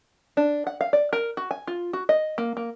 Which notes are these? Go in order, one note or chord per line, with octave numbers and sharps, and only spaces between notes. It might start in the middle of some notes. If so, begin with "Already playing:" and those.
D4
F#5
F5
D5
A#4
F#4
G#5
F4
F#4
D#5
A#3
A#3